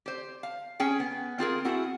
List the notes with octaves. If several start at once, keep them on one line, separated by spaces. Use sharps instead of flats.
G4 C5
F5
C#4 G#4 G5
B3
C4 F4 G#4 A#4
C4 E4 F#4 G#4